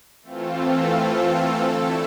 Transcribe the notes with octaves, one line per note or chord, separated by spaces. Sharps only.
E3 A3 C4 F4 A4
D3 A3 E4 A4